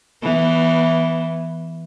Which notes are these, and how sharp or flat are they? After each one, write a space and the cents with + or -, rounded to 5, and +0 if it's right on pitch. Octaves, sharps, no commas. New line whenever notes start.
E3 +0 B3 -15